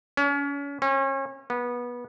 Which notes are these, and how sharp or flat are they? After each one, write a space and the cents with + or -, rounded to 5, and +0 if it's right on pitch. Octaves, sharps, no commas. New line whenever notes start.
C#4 +35
C#4 -35
B3 -20